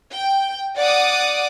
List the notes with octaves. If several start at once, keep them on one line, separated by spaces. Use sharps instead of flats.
G5
D5 F#5 D6 D#6